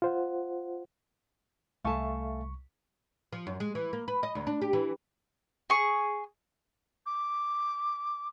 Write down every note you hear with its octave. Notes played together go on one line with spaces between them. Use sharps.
F4 C5 F#5
C2 A3 A4 E5 F5 G#5 A5 C#6
F3
F#2
G#3
E3
A#3
B4
D#5
D2
D4
G4
E3
G#4 C#6
D6